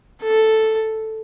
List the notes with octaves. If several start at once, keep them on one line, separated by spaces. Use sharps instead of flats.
A4